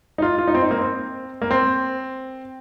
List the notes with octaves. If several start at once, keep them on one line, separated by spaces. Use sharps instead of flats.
D#4
F4
F4
D#4
C4
D#4
A#3
C4
A#3
C4